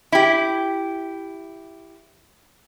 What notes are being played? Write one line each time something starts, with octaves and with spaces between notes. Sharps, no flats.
E4 G4